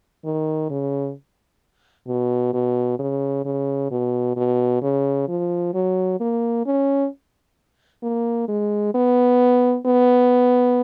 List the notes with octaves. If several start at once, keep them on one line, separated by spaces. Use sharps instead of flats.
D#3
C#3
B2
B2
C#3
C#3
B2
B2
C#3
F3
F#3
A#3
C#4
A#3
G#3
B3
B3